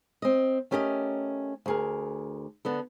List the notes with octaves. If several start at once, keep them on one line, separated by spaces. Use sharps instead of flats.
C4 D#5
A3 C#4 G4 A#4 C#5 D#5
D2 G#4 A#4
D3 B3 A4